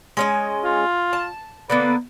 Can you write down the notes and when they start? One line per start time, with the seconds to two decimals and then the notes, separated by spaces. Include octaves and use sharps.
0.17 G#3 C#4 D#5
0.64 F4
1.13 A5
1.70 D3 A#3 B3 B4